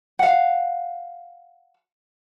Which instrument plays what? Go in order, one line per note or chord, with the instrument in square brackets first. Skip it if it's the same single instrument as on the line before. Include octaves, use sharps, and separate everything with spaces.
[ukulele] F5 F#5